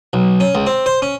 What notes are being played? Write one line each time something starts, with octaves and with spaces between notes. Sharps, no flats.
B1
C#4
C#2
C4
C5
C#4